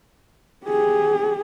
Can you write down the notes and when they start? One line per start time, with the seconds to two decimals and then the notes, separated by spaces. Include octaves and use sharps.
0.65 G4 G#4